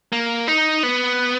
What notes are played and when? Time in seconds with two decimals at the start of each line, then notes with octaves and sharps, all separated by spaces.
0.12 A#3
0.48 D#4
0.83 B3